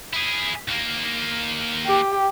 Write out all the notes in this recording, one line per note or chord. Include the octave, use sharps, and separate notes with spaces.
E4 G#4
D#2 A#3
G4